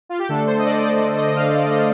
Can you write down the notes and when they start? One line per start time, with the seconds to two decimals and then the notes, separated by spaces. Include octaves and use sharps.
0.09 F4
0.19 G4
0.29 D3 A3 D4 A4
0.47 C5
0.59 D#5
0.64 D5
0.77 D#5
0.82 D5
1.00 D3 A3 D4
1.17 D#5
1.35 F5
1.53 D5
1.71 D3 A3 D4 D#5